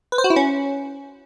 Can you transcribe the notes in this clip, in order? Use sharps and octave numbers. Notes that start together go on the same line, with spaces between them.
B4
C5
F#4
E4
C#4